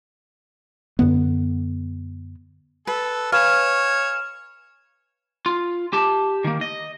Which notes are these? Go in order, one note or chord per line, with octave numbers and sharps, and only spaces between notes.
F#2 D3 B3
A4 B4
B4 C#5 F5 G#5 F6 E7
F4
G4 A5
D#3 A#3
D#5